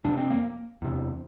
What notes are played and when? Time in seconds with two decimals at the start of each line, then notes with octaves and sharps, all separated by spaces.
0.04 F2 C3 D4
0.17 C4
0.30 A#3
0.82 E2 C3